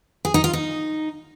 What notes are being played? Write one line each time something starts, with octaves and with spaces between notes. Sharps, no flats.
G#4
D#4
F4
D#4